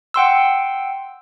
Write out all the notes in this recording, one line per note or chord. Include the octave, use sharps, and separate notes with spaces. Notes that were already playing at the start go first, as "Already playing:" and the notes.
F#5 G5 C6 E6